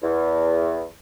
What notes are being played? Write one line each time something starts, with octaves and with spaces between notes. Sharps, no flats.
E2